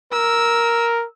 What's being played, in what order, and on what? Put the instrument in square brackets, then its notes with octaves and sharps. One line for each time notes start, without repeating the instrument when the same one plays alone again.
[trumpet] A#4 [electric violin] E6